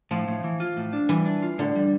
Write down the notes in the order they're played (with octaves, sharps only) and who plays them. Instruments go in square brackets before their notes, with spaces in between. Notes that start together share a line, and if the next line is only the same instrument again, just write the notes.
[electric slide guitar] A2 [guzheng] F3
[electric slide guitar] A2
E3
F4
A2
D4
[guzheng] E3 [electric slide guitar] G3
[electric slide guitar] D4
F4
[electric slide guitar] A2 [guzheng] D3
[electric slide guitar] G3